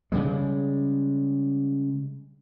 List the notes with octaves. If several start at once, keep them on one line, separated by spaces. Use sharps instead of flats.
C#3 G3 G#3